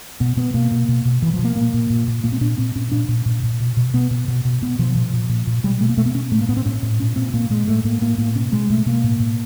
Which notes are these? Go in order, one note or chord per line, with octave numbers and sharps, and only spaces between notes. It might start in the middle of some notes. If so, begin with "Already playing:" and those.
B2 B3
B2 B3
B2 A#3
B2
B2
B2
B2 E3
F3
B2
A#3
A#2 A#3
A#2
A#2
A#2
A#2 A#3
C4
A#2 D4
A#2 C4
A#2 C#4
A#2 D4
A#2
A#2
A#2
B2
B2
B2 B3
B2
B2
B2
B2 B3
B2 F3
A#2 F3
A#2
A#2
A#2
B2 G3
B2 A3
A#3
B2 A3
B3
B2 C#4
A2 A3
A#3
A2 B3
C4
A2 C#4
A2
A#2 C#4
A#2 C4
A#2 A#3
A#2 G#3
A2 A3
A2 A#3
A2 A#3
A2 A#3
B2 C#4
B2 G#3
B2 A3
B2 A#3
A2
A2